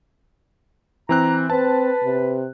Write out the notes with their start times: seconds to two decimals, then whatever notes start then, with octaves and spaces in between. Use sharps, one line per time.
1.09 E3 C4 A#5 F#6
1.50 C4 B4 A5
2.04 C3